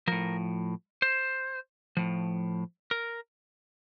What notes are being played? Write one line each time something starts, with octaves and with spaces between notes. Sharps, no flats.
A2 F3 A#4
C5
A2 F3
A#4